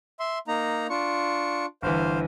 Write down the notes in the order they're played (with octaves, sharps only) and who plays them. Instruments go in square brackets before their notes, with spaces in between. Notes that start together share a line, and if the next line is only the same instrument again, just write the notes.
[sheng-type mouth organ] E5 C6
A#3 D#4 A#5
D4 F4 C#6
[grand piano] G1 E3 [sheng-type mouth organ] C5 F5